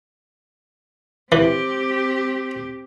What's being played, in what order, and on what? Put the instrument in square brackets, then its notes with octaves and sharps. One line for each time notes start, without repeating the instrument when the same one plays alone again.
[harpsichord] E3 [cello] C4 G4